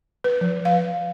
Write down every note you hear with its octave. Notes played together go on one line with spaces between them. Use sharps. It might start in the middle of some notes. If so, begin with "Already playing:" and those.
B4
F3
F5